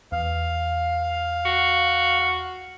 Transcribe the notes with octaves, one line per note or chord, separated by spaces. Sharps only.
E2 F5
F#4